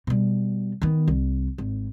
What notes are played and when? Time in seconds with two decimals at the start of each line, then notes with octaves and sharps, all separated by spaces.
0.07 B2 G3
0.82 D#3 B3
1.08 C2
1.58 G#1